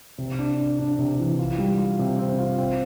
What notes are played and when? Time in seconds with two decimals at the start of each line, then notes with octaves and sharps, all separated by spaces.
0.18 C3
0.39 D4
0.59 D4
0.79 D4
0.99 C3
1.19 E3
1.39 F4
1.58 G3
1.78 F4
1.99 C3
2.19 C4
2.39 F4
2.58 C4